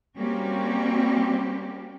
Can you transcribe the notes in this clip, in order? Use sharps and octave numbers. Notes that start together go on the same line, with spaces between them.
G3 A#3 C4 C#4 F#4 G4